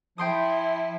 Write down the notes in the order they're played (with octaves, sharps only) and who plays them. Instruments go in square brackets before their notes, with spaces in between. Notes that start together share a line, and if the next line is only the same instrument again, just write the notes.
[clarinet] F3 [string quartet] E4 [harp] G5 C6 D#6